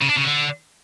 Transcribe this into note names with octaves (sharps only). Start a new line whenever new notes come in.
C#3
D4
C#3
D3